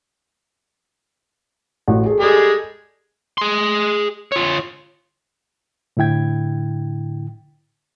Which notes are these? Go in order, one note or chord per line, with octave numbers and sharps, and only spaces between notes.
A1 F#4
G#4 A4
G3 G#3 G#4 A4
G#4 C6
F4 C#5
A2 D3 E4 G5 G#6